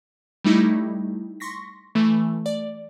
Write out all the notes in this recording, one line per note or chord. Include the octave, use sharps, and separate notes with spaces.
G3 A3 D#4 E4
C6 C#6 A#6 B6
E3 A3
D5